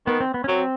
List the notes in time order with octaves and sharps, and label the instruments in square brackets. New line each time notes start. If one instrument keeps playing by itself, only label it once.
[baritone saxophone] D#3 [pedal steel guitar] B3
[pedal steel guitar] C4
B3
C#4
[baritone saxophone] F#3 [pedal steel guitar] C4